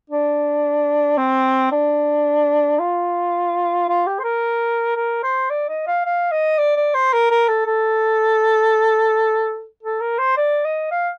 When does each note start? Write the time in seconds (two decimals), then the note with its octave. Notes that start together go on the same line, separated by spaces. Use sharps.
0.10 D4
1.18 C4
1.72 D4
2.79 F4
3.89 F4
4.07 G4
4.19 C5
4.24 A#4
4.96 A#4
5.23 C5
5.50 D5
5.69 D#5
5.87 F5
6.05 F5
6.31 D#5
6.58 D5
6.76 D5
6.94 C5
7.13 A#4
7.31 A#4
7.48 A4
7.66 A4
9.83 A4
10.01 A#4
10.19 C5
10.37 D5
10.65 D#5
10.91 F5